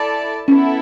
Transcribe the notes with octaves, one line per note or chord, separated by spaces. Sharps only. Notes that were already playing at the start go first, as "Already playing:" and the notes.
Already playing: E4 A4 D5 A5
B3 C#4 E4 A4